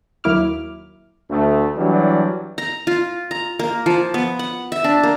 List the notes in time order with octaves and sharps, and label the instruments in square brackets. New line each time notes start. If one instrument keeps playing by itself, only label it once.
[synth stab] D#2 F#3 A#3 E4 D6 F6
[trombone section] D2 A3
E3 F#3 G3 D4
[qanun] A#5
F4
A#5
A#3
F3
B3
F#5
E5
D4
A#3